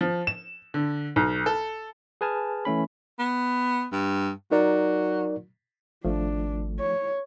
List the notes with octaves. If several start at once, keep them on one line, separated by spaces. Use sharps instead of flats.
F3
E7
D3
B1
A4
G#4 B4 G#5 A5 F6
E3 A3 C#4 B5
B3
G2
F#3 D#4 A#4 D5
G#1 F3 A3 D4
C#5